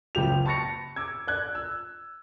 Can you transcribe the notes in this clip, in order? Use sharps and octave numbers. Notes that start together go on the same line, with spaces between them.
F#1 C#2 G4 F7
A5 B5 C#6 A6 A#6 C#7
D6 E6 G#6
D5 F#6 G#6
E6